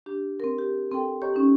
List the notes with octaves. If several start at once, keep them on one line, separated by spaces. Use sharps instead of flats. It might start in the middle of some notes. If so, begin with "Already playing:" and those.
D4 G4
C4 A#4
G4
C4 A4 G5
G4 C#5 D#5 A#5 C#6
C#4 D#4